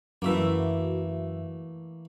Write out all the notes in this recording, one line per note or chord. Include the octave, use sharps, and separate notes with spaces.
F#2 E3 A3 A#3 F#4 E5